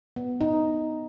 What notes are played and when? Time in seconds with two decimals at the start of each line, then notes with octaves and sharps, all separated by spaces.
0.16 B3
0.41 D#4